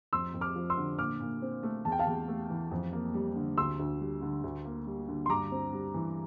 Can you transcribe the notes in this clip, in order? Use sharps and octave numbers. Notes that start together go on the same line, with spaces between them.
F2 C6 E6
F2
D6 F6
F3
C6 E6
D3
A#2 D6 F6
A#2
C4
A3
E2 A5
G5
F5 A5
E2
A3
E3
F2
A#3
G3
D3
D2 C6 E6
D2
G3
D3
D2
A#3
G3
D3
C6
G2 A#5 D6
C4
G3
E3